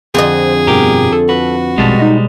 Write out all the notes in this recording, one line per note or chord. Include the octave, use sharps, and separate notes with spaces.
F2 D3 G#4 C5 D#5
G2 B2 G4 A#4
A4
F#4 B4
A#1 B2 G3 G#3 A5
D#4 D#5